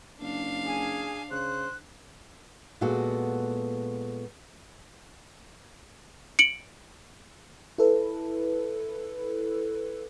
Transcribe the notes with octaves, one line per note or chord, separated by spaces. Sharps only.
F#1 D4 F5
G#4 G#5
C#3 C5 F#6
A#2 G#3 B3 F#4 A4
C#7 D7 F#7
E4 A4 B4